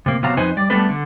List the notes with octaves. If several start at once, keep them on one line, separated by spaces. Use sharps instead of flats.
C3 A#3
C3 F#3 B3 F5 A#5
F2 D#4 B4 C5 D#5 G#5
G3 D5
G3 A3 B3 D4 A4 B4
D3